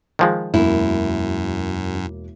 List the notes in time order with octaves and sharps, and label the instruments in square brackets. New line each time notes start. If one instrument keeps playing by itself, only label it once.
[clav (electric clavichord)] D#3 F3 G#3
[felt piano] E1 A#3 [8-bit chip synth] F#2 [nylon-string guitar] E4